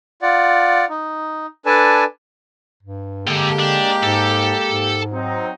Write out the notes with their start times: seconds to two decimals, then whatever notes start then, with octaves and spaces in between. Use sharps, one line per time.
0.22 F4 D5 F#5
0.90 D#4
1.66 D4 A4 B4 D5 G#5 A5
2.83 G2
3.28 D3 G#3 A#3 G4 A4 G5
3.59 D4
4.03 G#2 A4
4.69 G#2
5.12 F#3 C4 D#4